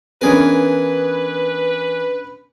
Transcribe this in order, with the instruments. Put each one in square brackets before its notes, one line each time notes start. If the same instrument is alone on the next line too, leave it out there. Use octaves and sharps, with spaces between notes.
[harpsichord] E3 G#4 A#4 [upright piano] B3 C#4 D4 [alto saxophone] B4